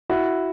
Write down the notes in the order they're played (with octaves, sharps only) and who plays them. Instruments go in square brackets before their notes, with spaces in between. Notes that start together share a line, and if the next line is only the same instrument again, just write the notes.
[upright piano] E4 [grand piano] F#4